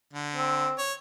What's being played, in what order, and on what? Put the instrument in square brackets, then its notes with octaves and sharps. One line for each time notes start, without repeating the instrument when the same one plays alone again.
[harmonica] D3
[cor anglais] C4
[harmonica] C#5